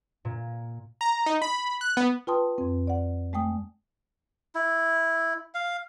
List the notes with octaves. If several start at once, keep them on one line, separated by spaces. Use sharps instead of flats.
A#2
A#5
D#4
B5
F#6
B3
F4 B4 G5 A5 C6 D#6
F2 C4
D5 F#5
G#3 A3 G5 D#6
E4
F5